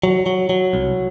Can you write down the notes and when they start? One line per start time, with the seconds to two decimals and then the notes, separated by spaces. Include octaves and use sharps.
0.04 F#3
0.26 F#3
0.49 F#3
0.73 C2